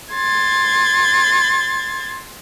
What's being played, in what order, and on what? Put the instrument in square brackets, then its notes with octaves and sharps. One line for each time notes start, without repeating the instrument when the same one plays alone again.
[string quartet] C6 G#6 A6